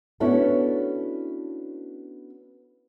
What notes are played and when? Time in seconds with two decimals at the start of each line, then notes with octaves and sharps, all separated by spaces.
0.20 B3 C#4 D4 E4 F#4 A4